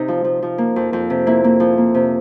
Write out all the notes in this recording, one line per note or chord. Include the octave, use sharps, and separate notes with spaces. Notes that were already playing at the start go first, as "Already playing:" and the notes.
Already playing: C3 D#4
F3
F3
F3
A#3
F2
F2
C3
A#3 E4
A#3
F3
A#3
C3